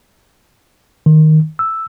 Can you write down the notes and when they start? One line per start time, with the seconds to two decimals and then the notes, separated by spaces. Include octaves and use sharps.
1.06 D#3
1.59 E6